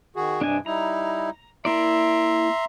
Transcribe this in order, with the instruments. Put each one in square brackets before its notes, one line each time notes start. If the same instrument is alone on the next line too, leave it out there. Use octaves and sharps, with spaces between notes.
[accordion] D#3 F#4 G#4
[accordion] G2 C3 [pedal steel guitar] D4 D#5 G#5
[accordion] G3 D#4 E4 [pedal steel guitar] A#5
[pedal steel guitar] A#3 E4 D5 [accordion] E5 A#5 C6